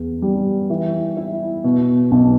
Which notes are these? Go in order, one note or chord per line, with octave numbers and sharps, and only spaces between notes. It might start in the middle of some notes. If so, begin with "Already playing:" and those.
Already playing: E2
G3
E3
E4
B2
B1